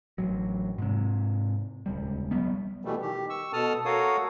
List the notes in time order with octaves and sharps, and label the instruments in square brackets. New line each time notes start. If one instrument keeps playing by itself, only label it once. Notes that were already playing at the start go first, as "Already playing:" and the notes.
[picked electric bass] A1 F#3
G#2 C3
D#1 C#2 G3
F#3 G3 B3
[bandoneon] B2 E3 G3 A3
D#3 G4
C#6 E6
B2 A4 A5 D#6 F6
F#4 A4 A#4 C#5 F5 D#6